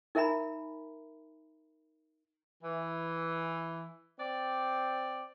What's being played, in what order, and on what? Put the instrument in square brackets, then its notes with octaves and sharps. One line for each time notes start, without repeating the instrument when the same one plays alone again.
[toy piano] D#4 A#4 E5 G#5 A#5 B5
[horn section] E3
C4 D5